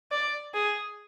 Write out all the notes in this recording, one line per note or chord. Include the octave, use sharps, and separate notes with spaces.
D5
G#4